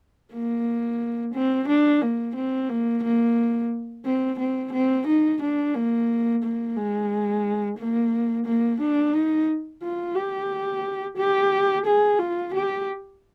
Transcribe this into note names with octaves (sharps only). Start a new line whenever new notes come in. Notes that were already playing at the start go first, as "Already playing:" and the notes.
A#3
C4
D4
A#3
C4
A#3
A#3
C4
C4
C4
D#4
D4
A#3
A#3
G#3
A#3
A#3
D4
D#4
F4
G4
G4
G#4
F4
G4